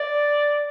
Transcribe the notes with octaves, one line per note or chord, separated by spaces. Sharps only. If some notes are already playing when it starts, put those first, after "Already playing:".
Already playing: D5